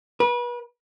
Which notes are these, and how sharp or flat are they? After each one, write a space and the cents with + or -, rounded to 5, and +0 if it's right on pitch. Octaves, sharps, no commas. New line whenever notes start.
B4 -35